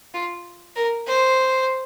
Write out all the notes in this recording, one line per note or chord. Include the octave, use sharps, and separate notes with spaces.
F4
A#4
C5